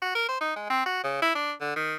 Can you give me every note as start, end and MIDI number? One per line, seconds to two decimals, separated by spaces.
0.02 0.10 66
0.15 0.29 70
0.29 0.36 72
0.41 0.55 63
0.56 0.67 56
0.70 0.81 60
0.86 1.02 66
1.04 1.21 49
1.22 1.33 64
1.35 1.53 62
1.61 1.73 50
1.76 1.97 51